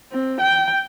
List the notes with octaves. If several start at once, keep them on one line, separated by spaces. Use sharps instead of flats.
C4
G5